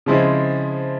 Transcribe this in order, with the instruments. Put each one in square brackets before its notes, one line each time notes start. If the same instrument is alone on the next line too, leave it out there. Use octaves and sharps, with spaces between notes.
[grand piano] C#3 F3 G#3 C4 E4